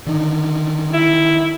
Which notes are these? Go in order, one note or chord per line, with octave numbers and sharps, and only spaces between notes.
D3 D#3
E4